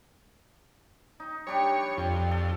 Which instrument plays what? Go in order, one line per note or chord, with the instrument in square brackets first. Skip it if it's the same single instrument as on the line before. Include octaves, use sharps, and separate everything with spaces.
[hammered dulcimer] D#4
[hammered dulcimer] G3 D4 G4 [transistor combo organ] C#5
[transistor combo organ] F2
[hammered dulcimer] A4